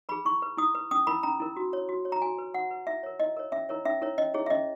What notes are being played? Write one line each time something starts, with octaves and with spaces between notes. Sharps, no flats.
G#4 B4 B5
E4 C#6
B4
E4 D#6
B4
C#4 D#6
E4 A#4 B5
C#4 A#5
E4 A#4
F#4
C#5
F#4
C#5
A#5
F#4 G#5
B4
F#4 F#5
B4
E4 E5
A#4 C#5
E4 D#5
A#4 C#5
C#4 E5
E4 A#4 C#5
C#4 E5
E4 A#4 C#5
C#4 D#5
E4 G#4 C#5
E5
C#4 D#5